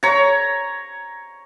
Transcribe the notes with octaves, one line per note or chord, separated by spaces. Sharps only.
C#5 A#5